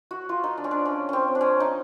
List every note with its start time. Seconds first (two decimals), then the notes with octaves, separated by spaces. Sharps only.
0.11 F#4
0.29 F4
0.44 D#4
0.58 D4
0.64 C#4
0.71 D4
0.85 C#4
1.09 C4 C#4
1.35 D4
1.41 C#4
1.60 D#4